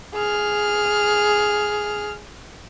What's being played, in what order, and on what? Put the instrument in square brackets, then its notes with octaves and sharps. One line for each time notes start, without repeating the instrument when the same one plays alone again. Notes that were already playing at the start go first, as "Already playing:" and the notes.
[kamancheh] G#4 F6